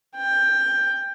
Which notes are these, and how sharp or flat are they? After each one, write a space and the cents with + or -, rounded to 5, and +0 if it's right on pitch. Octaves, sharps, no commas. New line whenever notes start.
G5 +15